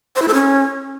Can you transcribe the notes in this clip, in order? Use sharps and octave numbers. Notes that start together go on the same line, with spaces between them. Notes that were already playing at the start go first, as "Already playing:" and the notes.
C5
E4
A4
C#4